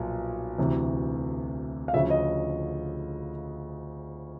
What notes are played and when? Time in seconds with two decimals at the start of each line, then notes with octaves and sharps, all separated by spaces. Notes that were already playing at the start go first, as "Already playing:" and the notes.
Already playing: B1 A#2 F3
0.58 D2 C3 E3
1.88 F5
1.93 D2 C#3 F3 E5
2.10 D#5